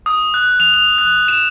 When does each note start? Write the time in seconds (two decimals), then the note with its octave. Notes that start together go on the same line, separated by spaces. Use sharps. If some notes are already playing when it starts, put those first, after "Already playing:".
0.06 D#6
0.34 F#6
0.60 F7
0.74 F7
0.98 F#6
1.28 E7